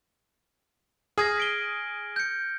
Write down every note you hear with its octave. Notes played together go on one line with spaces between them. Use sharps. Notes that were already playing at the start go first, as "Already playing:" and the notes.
G#4 D#6 F6 G#6 A#6
B6 D7 G7
G6 C#7